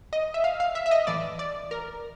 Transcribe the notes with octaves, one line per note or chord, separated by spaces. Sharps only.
D#5
E5
F5
F5
E5
E5
D#5
A2 E3 D5
D5
A#4